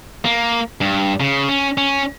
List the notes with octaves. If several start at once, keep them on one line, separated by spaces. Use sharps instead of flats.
A#3
G2
C#3
C#4
C#4